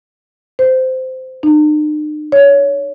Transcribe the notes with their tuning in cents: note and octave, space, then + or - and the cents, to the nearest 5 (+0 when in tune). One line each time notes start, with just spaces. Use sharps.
C5 -15
D#4 -45
C#5 +20